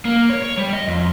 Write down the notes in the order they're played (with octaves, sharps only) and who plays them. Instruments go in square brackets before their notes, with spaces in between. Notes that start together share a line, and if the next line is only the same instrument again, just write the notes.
[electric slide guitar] A#3
C#5
C#5
G3
D#5
F2